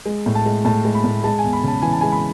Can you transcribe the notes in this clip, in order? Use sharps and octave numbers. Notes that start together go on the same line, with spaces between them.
G#3
A2
A5
G#3
A2 A5
G#3
B5
A2
G#3 A5
G#5
E2
B5
C#3 A5
E3 G#5
A5
G#3 G#5
B5